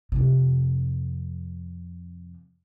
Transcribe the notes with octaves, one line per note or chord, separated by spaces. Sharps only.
F2 C3